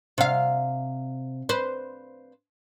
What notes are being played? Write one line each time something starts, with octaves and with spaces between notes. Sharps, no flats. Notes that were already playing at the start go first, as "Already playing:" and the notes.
C3 F5
B4 C5